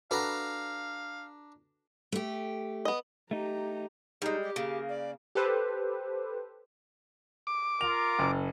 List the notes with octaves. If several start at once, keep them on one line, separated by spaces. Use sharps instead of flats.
D4 F#4 A4 B4 F5 A#5
A3 G4
B3 D#5
A3 D#4 G4 A#5
G3 G#3 D#4
G4
C#3 A#3
D5
G4 A4 B4 C5
D6
F4 A#4 F7
F#1